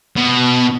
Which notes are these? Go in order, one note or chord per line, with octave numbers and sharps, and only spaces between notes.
B2